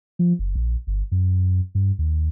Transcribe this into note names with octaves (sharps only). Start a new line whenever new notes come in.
F3
F#1
A#1
G1
F#2
G2
D#2